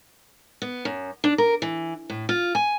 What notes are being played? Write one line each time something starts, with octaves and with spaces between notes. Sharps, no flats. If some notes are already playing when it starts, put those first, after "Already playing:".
B3
F#2
D4
A#4
E3
A2
F4
G#5